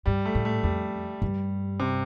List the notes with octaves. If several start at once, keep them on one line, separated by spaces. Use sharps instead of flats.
G2 G3
A3
A2
A3
F2 G3
G2
C3